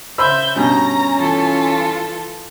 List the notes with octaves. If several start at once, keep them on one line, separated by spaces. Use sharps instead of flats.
C#3 C5 E5 B5 E6 G6
G2 B2 C#4 A#5
E3 F4 A4